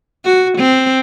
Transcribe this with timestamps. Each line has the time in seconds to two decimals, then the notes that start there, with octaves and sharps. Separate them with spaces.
0.25 F#4
0.58 C4